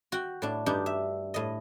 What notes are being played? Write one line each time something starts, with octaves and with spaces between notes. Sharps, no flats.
F#4 G5
A2 D4
G2 D4 D#4 G4
E5
A2 D#5